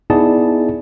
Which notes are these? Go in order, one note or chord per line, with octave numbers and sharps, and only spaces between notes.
B3 D#4 E4 G#4 D5 A5